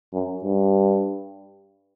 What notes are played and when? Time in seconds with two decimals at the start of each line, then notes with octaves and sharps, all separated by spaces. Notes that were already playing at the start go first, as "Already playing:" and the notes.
0.14 F#2
0.44 G2